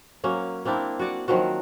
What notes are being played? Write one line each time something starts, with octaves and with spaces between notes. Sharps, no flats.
F#3 A#3 C#4
A#3 C4 D4 E4
F#4 D5 F#5
D#3 F3 F#3 F#4